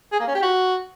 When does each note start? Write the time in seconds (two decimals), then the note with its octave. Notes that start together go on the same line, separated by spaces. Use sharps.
0.12 G#4
0.20 A#3
0.27 C#4
0.35 G4
0.42 F#4